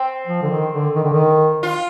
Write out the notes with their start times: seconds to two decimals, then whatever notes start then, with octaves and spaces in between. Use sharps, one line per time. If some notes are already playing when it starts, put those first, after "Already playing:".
Already playing: C4
0.27 F3
0.42 D3
0.50 D#3
0.72 D3
0.95 D#3
1.04 D3
1.13 D#3
1.63 F4